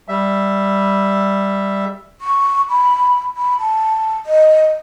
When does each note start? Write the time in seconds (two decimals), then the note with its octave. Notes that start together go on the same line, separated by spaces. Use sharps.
0.08 G3 E5
2.21 C#6
2.69 B5
3.36 B5
3.59 A5
4.26 D#5